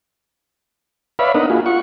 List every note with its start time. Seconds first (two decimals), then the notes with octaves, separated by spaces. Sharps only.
1.19 B4 C#5 D5 E5 F5 B5
1.34 B3 D4 D#4 A#4 D#5 F#5
1.50 A#3 F4 F#4 G#4
1.66 F4 F#5 C#6